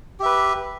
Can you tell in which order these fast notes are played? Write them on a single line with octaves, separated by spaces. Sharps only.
G4 E5 B4